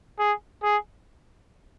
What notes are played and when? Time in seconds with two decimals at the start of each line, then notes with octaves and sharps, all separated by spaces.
0.19 G#4
0.63 G#4